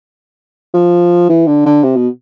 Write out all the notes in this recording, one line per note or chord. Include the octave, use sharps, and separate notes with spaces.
F3
E3
D3
D3
C3
B2